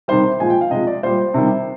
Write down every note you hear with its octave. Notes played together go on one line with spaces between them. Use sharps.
C3 D#3 G3 C5
A#2 F3 G#3 G#5
G5
F5
C3 F3 G#3 D#5
D5
A#2 G3 C5
C3 D#3 G3